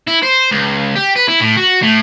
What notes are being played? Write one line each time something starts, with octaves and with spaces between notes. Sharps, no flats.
E4
C5
C#2
G4
B4
E4
A2
F#4
A2